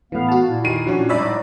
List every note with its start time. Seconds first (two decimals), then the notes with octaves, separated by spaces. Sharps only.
0.12 A2 E3 B3 F5
0.29 F#4 A5
0.47 A#2 E4
0.64 D#3 C7 D#7
0.86 F3 C#4 D4 F#4
1.09 G#1 A2 G3 D#4 C#5 D5 E5 B5